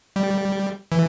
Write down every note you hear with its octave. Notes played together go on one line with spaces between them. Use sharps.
G3
E3